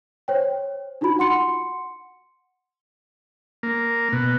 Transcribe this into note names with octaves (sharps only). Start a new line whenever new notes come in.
C5 C#5 G5
D4 D#4 F4 F#4 B5
F#5 C6 C#7
A#3
B2